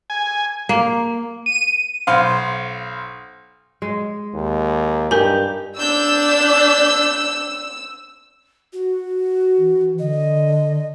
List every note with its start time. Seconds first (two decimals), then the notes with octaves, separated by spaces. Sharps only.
0.10 G#5
0.69 A#3
1.46 D#7
2.07 B1 C5 F5
3.82 G#3
4.34 D#2
5.11 G2 D#4 G4 A#4 G#5
5.79 D4 E6 G6
8.73 F#4
9.58 E3
9.99 D3 D#5